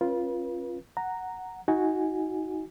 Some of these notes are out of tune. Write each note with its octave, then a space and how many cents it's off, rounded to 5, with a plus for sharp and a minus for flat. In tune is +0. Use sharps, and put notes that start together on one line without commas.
C#4 -35 F4 +0 B4 -35
F#5 +0 A#5 -5
D#4 +30 F#4 +0 G#5 +0